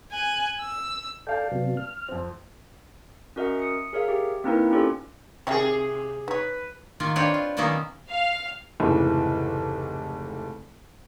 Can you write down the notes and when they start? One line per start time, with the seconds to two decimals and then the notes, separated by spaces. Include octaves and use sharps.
0.11 G#5 F#6
0.60 E6
1.27 A4 D5 F5 G5 A5
1.52 C3 F#3 B3
1.77 F6
2.09 F2 C4
3.36 C#4 F#4 A#4 D#5 E5 F#5
3.59 D#6 C#7
3.93 G#4 A#4 C#5 E5 F5
4.08 G4
4.44 A#3 C4 D#4 E4 A#4 B4
4.70 C#4 D#4 F4 G4 A4 C#5
5.47 C3 D#3 G4 G#4 C#5 E5 G5
6.28 D#4 B4 C#5
7.00 D#3 A#3 F4
7.16 C4 D4 B4 C#5 G5
7.34 F4
7.57 B2 D#3 F#3 A#3 B3 C#4
8.09 F5
8.80 F1 G#2 C#3 E3